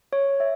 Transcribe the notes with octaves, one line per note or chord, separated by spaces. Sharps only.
C#5
E5